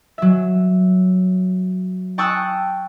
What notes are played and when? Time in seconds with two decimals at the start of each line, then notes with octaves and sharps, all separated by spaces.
0.18 F#3 E5
2.18 G5 A5 C#6 D#6 E6 F#6